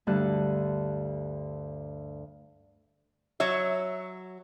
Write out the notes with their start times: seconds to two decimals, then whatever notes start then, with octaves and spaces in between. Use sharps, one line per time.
0.07 D2 G2 D3 A5 F#6
3.40 F#3 C#5 E5